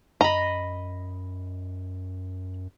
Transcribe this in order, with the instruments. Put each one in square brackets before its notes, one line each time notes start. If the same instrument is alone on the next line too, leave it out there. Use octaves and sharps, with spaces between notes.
[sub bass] F#2 [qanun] D#5 B5 [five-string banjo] A#5